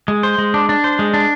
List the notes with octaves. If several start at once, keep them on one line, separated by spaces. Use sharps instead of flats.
G#3
C5
G#3
D4
D4
C5
G#3
D4